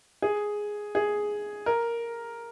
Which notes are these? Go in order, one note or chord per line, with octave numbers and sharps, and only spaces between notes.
G#4
G#4
A#4